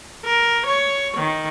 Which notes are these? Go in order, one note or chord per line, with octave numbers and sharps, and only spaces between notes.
A#4
C#5
D#3